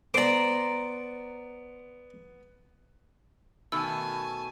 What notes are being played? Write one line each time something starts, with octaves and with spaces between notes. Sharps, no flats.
B3 C5 D5 A#5 D6
B2 D#3 A3 G#5 A5 E6